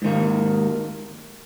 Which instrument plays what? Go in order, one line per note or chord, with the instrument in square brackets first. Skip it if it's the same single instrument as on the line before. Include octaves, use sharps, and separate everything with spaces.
[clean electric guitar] G#2 D#3 A#3